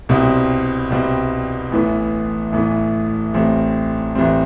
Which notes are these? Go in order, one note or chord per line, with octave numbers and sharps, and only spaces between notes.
C2 B2 G3 C4
C2 B2 G3 C4
A1 A2 E3 B3
A1 A2 E3 B3
A1 A2 G3 C4
A1 A2 G3 C4